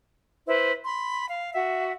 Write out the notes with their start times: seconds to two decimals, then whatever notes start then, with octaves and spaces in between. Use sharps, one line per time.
0.47 E4 B4 C5
0.85 B5 C6
1.28 F5
1.53 F#4 E5 F#5